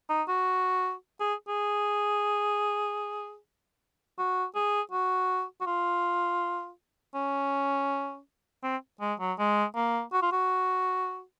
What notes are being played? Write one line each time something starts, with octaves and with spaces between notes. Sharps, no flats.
D#4
F#4
G#4
G#4
F#4
G#4
F#4
F#4
F4
C#4
C4
G#3
F#3
G#3
A#3
F#4
F4
F#4